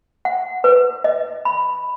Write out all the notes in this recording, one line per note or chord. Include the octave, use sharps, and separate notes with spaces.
F#5
B4
D#5
B5